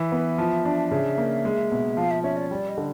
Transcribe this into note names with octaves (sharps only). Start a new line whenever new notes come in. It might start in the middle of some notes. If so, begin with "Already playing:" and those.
Already playing: E3 E5
B3
F3
D4
C#3
A#3
G#3
B2
F3 F5
E5
C#4 E5
D5
G3 D5
D#5
D3